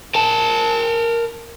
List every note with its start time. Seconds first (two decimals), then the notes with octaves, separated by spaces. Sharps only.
0.15 A#4 A5